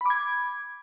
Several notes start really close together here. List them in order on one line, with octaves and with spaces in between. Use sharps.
B5 D6 G#6